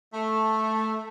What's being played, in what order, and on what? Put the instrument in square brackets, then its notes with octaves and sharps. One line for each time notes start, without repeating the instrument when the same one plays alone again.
[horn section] A3